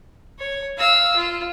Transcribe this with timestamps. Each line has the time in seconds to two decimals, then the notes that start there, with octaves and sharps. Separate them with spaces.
0.39 C#5
0.78 F5 E6
1.16 F4